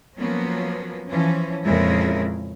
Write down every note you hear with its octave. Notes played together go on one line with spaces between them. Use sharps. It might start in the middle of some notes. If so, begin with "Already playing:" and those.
F3 F#3 A#3 B3 C#4
E3 F3 C#4
F2 A#2 C#3 G#3 E4 A#4